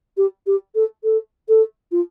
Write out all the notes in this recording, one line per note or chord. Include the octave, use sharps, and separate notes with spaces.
G4
G4
A4
A4
A4
F4